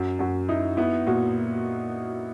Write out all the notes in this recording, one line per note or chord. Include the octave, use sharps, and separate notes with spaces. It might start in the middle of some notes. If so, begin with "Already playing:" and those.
Already playing: F#2 F#4
F#2 F#4
D#4 E4
B3 E4
A#2 F#4